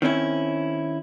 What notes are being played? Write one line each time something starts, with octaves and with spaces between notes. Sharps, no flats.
D#3 C4 C#4 E4